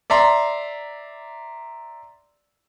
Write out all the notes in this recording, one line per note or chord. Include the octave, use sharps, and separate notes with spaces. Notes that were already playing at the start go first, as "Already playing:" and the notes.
D5 E5 A#5 C6